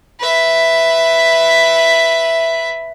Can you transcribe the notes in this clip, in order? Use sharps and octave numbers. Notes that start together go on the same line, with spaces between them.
B4 E5